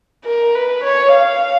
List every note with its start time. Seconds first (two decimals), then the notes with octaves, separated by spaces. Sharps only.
0.25 A#4
0.55 B4
0.84 C#5
1.15 F5